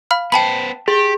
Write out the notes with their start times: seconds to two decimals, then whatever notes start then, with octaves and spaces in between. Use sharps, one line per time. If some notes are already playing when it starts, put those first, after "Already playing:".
0.11 F5 B5 F6
0.32 B3 C5 G5 A5 B5
0.88 G4 G#4